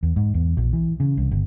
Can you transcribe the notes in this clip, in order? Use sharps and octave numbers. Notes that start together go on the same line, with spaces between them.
E2
G#2
E2
A#1
E3
C#3
C2
G1